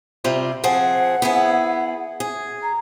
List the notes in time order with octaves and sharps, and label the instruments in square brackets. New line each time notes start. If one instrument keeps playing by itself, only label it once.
[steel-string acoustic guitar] C3 G3 F4
[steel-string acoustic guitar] F3 C4 G#4 [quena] F#5
[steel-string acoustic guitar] B3 E4 G#4
G#4
[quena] A#5